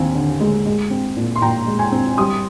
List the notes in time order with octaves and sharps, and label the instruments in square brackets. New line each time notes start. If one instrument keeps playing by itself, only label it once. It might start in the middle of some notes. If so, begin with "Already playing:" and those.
Already playing: [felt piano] D#2 C4 F5 G#5
D3
G#3
G#3
C4
A#2
C6
A#2 G5 A#5
G#3
G#5 C6
C4
G3 C6 D#6